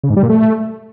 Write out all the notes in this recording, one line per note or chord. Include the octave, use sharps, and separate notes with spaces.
C#3
G#2
G3
A#2
A3